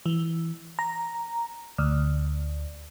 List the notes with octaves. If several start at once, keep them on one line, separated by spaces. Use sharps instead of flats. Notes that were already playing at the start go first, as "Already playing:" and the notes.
E3
A#5
D2